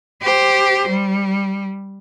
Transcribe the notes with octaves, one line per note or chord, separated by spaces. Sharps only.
G4 C5
G3